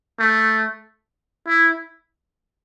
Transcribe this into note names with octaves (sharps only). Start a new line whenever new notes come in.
A3
E4